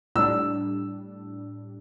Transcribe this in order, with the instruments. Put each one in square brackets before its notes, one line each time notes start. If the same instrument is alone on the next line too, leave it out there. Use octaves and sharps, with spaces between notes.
[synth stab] A2 G3 D4 [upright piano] E6